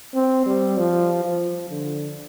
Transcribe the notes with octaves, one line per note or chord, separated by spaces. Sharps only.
C4
G3
F3
F3
D3